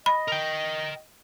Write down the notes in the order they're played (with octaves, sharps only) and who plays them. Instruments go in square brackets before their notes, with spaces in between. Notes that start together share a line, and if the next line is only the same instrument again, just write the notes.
[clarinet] D#5 [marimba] B5
[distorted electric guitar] A#4 G5